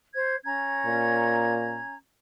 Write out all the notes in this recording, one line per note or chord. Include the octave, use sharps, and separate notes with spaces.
C5 G#6
C#4 A#5 G#6
A#2